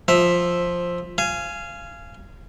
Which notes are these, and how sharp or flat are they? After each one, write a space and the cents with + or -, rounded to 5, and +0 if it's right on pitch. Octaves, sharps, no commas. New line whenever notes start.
F3 +5 E5 +0
F5 -20 G#5 +10